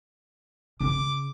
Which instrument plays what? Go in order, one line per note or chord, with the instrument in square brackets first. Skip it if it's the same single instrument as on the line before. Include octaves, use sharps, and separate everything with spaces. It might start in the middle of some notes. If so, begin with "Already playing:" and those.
[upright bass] C#3 [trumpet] D6